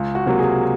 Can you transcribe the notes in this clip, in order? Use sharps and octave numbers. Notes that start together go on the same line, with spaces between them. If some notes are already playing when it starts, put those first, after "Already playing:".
Already playing: C#2
F#4
C3 F#3 A#3
G#4